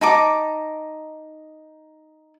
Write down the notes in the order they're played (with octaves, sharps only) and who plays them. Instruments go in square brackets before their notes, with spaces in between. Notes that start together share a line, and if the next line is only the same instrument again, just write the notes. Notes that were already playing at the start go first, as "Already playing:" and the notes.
[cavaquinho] D#4 A5 A#5 D6